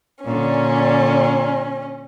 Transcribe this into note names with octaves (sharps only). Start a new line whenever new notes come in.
A#2 D3 C#4